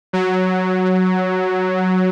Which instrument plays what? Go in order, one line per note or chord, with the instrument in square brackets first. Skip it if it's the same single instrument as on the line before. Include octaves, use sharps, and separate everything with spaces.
[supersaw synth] F#3